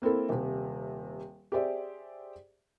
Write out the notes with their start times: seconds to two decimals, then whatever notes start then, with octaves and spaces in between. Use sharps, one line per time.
0.02 A#3 C4 E4 A4
0.29 D#1 C3
1.52 G4 G#4 C5 D5 E5